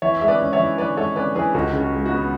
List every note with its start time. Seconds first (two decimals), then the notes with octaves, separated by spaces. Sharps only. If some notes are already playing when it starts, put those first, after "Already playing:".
0.02 E3 C#5 E5
0.21 G#3 E5
0.28 B4 D5
0.40 C#4
0.53 C#5 E5
0.59 E3
0.78 E3 B4 D5
0.97 G#3 A4 C#5
1.16 C#4 B4 D5
1.35 E3 G#4 B4
1.54 C#2 F#4 A4
1.73 C#3
1.80 F#4
1.93 G#3
2.06 F#4
2.12 B3